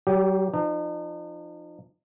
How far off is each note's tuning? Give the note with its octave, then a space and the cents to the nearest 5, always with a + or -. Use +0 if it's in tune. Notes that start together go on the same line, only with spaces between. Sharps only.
F#3 +40 G4 +0
F3 -10 D#4 -40